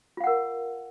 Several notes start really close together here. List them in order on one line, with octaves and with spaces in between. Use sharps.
F4 F5 F#5 A#4